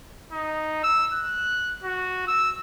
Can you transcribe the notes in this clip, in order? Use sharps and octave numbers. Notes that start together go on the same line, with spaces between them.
D#4
E6
F#6
F#4
E6